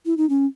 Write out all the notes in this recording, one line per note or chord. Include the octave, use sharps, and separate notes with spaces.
E4
D#4
C#4